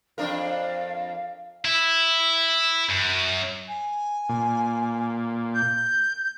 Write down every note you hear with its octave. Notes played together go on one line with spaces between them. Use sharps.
F2 D4 A#4 F5
E4
F#2
G#5
A#2
G6